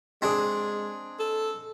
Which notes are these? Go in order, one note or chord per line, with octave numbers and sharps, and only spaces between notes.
G#3 C4 D4 G#4
A4